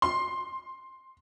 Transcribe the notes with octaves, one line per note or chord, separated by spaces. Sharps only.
C6